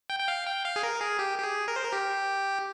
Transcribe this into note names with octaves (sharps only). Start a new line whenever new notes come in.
G5
G5
F5
G5
F5
G#4
A#4
G#4
G4
G4
G#4
A#4
C5
A#4
G4